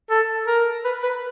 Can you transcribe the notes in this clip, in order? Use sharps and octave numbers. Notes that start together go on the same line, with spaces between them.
A4
A#4
B4
B4